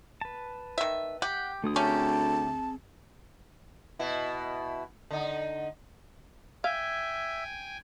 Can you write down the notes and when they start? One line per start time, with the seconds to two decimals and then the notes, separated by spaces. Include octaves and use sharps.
0.21 B4 A5
0.78 D#3 E5
1.22 G4 F#5 G5
1.64 D2 A3 D#6
1.76 A3 C4 C#4 G4 G#4 A5 A#5
3.99 B2 E4
5.11 D3 D#4
6.64 E5 F5 G5 G#5 G#6